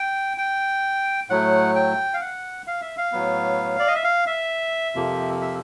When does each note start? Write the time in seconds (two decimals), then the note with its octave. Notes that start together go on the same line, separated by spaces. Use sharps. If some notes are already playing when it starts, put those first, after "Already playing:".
Already playing: G5
0.38 G5
1.30 A2 F#3 A3 F#5
1.75 G5
2.14 F5
2.21 F#5
2.67 F5
2.82 E5
2.98 F5
3.12 A2 F#3 B3
3.79 D5
3.87 D#5
3.95 E5
4.04 F5
4.27 E5
4.95 F2 C3 F3 A#3
5.41 E5